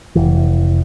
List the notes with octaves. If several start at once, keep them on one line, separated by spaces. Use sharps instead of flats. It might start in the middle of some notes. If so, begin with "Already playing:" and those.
F1 E3